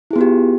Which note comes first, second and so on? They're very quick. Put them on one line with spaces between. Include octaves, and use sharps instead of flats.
E4 G#4 B3 F4 G4